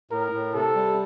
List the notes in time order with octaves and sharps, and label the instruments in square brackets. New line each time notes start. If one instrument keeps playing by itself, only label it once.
[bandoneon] A2 [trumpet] A#4
[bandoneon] A2
[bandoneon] C3 [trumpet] A4
[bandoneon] G3